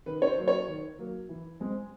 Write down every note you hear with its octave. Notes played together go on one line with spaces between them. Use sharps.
D#3 B4
C#5
C5
F#3 A#3
C#5
D#3
F#3 A#3
E3
G#3 C4